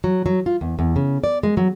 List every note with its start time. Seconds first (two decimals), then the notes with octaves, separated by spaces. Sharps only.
0.04 F#3
0.26 F#3
0.46 F4
0.61 E2
0.79 E2
0.96 C#3
1.24 D5
1.43 G#3
1.57 F#3